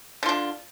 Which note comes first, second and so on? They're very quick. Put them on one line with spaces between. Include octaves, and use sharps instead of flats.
D3 F4 D4